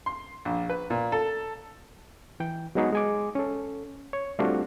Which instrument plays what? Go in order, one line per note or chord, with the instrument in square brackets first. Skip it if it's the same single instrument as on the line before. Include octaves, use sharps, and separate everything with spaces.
[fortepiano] C6
A#1
B4
A#2
A4
[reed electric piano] E3 G5
F#3 G#3 B3 D#4 F#4 G#4
G#3 G#5 D6
C#4 A4
C#5
G3 A3 C4 D4 F4 F#4